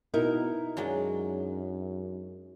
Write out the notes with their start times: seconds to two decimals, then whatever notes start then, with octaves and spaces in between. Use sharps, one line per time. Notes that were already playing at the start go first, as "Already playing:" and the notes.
0.14 B2 D#4 E4 A#4
0.77 F#2 F#3 G#3 D4